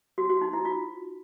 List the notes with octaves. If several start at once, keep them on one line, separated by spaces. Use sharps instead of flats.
F#4
F#4
D#4
E4
F4